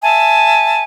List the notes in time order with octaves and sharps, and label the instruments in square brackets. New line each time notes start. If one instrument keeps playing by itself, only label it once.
[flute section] E5 G#5 A5